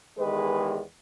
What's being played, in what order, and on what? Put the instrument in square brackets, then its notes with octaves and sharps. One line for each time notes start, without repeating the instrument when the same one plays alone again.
[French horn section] E2 D#3 G#3 G4 G#4 B4